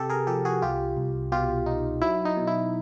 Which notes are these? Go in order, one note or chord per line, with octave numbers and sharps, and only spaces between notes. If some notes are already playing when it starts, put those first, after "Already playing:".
Already playing: C3 G4 A4
G#4 A#4
F3 G4 A4
F#4 G#4
C2 F4 G4
C2
B2 F4 G4
D#4
F#3 E4
D#4
B2
E4